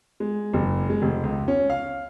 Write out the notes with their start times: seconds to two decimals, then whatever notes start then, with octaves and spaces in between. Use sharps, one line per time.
0.20 G#3
0.53 F#1
0.90 G#3
1.02 F1
1.23 C#2
1.48 C#4
1.70 F5